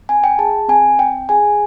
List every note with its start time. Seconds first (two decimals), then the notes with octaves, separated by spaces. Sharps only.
0.09 C4 G#5
0.24 G5
0.39 G#4 A5
0.68 C4 G#5
0.99 C4 G5
1.29 G#4 G#5